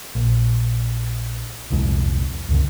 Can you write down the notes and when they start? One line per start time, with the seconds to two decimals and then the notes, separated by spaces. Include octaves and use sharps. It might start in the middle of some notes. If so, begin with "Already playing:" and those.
0.15 A#1
1.70 D#1 C2 F2 G#3
2.48 C#2 F#2 C#3